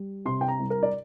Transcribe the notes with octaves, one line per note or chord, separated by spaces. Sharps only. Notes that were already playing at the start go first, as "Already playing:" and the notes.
Already playing: G3
C3 C6
G5
A#5
C2
A#4
D5